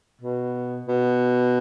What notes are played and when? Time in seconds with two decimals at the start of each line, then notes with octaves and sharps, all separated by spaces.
0.21 B2
0.87 B2